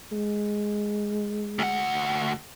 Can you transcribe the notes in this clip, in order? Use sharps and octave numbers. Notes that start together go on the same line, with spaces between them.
G#3
D2 F#5